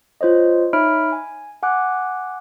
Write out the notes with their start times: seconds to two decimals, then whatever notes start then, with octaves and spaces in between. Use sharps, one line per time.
0.21 F4 C5 C#5 D#5
0.73 D#4 C#5 E5 B5 F6 D7
1.12 G#5
1.63 F#5 G#5 D6 F#6